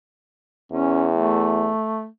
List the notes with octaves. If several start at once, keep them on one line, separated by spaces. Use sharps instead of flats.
E2 C#4
A3